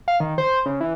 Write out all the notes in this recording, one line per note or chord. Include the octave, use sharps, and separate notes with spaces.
F5
D#3
C5
C#3
E3